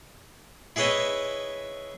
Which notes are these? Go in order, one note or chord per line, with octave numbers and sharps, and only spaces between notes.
E4 G#4 B4 C#5 D#5 E5